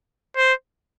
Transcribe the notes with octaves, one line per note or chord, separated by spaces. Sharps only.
C5